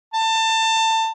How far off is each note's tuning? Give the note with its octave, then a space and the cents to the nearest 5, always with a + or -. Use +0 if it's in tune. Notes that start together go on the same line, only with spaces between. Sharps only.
A5 +25